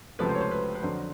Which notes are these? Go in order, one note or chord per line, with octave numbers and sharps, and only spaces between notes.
C#2 C3 F3 A3 B4
C5
C#5
C5
B4
B4
F2 D3 F#3 C5